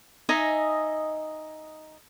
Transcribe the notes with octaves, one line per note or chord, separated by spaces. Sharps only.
D#4 D#5 E5 G#5